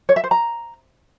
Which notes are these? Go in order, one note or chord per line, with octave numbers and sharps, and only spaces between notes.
C#5
E5
C5
A#5